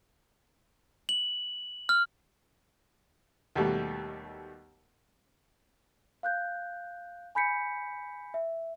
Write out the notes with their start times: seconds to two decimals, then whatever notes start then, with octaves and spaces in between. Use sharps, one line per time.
1.09 F#7
1.89 F6
3.55 D#2 B2 G3 A3
6.23 F5 F#6 G6
7.35 G#5 B5 G6 B6 C#7
8.34 E5